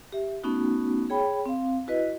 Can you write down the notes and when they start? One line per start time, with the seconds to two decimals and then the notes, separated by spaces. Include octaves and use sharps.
0.12 G4 E5
0.44 A3 B3 C#4 D#4 F#4
1.10 G#4 C#5 G5 B5
1.46 C4 F5
1.87 E4 F#4 B4 D#5